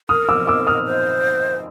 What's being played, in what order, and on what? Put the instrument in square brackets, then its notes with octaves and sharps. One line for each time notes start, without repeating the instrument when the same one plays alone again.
[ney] A#4 [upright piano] D#6 F6
[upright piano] D6 E6
D6 E6
D#6 F6
[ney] C5